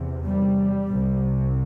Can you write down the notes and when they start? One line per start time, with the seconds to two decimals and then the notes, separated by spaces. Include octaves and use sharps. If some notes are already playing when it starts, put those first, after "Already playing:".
Already playing: E2 C3
0.25 G3
0.89 C2 C3